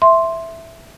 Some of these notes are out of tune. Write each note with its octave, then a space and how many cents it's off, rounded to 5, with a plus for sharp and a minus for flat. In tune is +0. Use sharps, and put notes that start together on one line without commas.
E5 +0 C6 +5